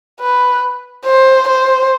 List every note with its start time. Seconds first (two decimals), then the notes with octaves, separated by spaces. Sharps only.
0.20 B4
1.05 C5
1.48 C5